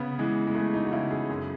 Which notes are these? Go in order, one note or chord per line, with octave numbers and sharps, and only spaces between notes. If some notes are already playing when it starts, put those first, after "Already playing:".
Already playing: C#3 B3
E3 G#3
G#3
E3 A3
D#4
F#4
C#3 E4
G#4
F#2